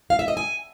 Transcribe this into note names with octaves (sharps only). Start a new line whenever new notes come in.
F5
E5
D#5
G#5